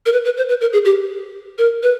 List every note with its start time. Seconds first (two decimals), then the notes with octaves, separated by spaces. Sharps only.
0.06 A#4
0.13 B4
0.25 B4
0.37 C5
0.49 B4
0.61 A#4
0.73 G#4
0.85 G4
1.58 A#4
1.83 B4